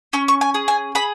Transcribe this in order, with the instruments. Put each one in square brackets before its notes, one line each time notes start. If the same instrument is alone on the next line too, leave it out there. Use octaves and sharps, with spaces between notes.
[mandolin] C#4 C#6
C#6
G#5
G#4
G#5
G#4 B5